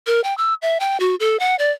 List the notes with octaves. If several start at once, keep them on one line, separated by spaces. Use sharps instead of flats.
A#4
G5
E6
E5
G5
F#4
A4
F#5
D5